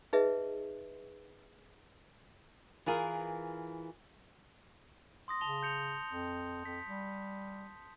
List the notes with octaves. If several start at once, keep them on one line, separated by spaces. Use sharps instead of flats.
D#4 G#4 B4 D#5 E5
E3 F4 G#4 A#4
C6 D#6 A#6
C#3 A5 F7 G7
G6 C#7 F7
F2
F2 B6
G3